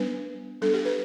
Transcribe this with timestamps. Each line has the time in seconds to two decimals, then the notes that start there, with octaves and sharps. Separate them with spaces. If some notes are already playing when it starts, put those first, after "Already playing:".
Already playing: G3 B3 D4 B4
0.62 G3 B3 D4 A4
0.74 G4
0.85 B4